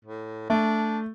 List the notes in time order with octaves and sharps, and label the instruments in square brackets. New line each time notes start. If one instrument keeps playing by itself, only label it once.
[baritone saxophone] A2
[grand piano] A3 [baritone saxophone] D4